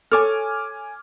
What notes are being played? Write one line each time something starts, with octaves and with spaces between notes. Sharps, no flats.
A4 C#5 G#5 D6 F6